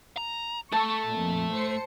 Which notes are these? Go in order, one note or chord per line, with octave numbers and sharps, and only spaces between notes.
A#5
A3 A4 A5 C#6
F2 A#2
A2 C5 C#7